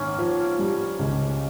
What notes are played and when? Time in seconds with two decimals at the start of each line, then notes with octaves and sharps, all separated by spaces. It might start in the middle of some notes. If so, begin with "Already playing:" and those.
Already playing: G#1 A#3 C#4
0.19 F3
0.59 G3
0.99 C#2